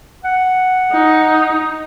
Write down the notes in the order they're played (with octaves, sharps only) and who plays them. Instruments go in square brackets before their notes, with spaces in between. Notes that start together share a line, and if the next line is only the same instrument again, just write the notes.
[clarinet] F#5
[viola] D#4